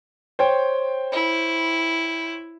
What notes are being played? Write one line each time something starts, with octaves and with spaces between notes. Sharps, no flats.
C5 C#5 G5
E4